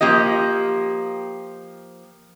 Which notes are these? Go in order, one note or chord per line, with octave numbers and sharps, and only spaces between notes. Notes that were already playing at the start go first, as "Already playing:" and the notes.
F3 A#3 G4 D#5